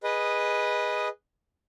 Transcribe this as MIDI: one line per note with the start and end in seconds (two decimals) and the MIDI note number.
0.03 1.08 68
0.03 1.08 71
0.03 1.08 75